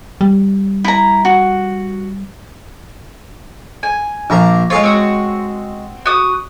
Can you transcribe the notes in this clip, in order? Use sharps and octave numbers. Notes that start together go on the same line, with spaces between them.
G3
E4 A#5
F#4
G#5
A#1 A#3 A#5
G#3 F4 G#4 C#5
C4 F#4
F#4 D#6